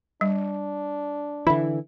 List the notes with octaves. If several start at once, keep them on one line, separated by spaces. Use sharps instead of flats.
G3 D4
D3 E3 E4